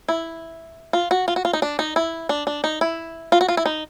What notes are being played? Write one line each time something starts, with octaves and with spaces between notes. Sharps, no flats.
E4
F4
F#4
F4
F#4
F4
D#4
D4
D#4
E4
D4
D4
D#4
E4
F4
F#4
F4
E4
D#4